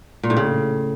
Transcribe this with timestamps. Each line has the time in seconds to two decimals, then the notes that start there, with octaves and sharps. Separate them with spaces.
0.23 A#2
0.30 A2
0.37 C#3